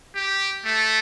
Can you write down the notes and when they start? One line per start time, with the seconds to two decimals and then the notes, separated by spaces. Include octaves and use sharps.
0.15 G4
0.65 A3